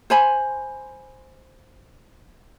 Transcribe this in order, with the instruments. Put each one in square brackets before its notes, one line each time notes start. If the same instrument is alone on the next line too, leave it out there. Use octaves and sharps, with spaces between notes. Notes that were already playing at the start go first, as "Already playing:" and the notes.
[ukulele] C5 G#5 B5